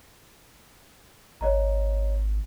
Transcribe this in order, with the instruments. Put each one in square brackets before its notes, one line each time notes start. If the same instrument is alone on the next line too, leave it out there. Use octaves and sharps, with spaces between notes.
[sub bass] G#1 [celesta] C#5 D#5 A#5